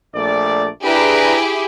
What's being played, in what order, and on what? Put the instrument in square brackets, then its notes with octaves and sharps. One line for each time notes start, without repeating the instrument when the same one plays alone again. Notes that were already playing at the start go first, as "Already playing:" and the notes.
[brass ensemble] A#1 A3 D5
[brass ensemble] D4 B4 A#5 [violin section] E4 G4 G#4